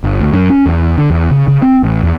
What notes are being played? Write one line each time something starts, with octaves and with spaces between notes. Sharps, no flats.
G1
D2
F#2
C#4
E2
D3
E2
C#3
C#3
C4
A1
E2